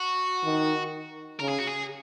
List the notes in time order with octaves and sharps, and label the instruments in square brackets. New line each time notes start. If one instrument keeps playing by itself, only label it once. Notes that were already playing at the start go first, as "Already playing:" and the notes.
Already playing: [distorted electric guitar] F#4
[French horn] D#3
[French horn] C#3 [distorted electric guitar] A#4
[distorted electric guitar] G#4
F#4
G#4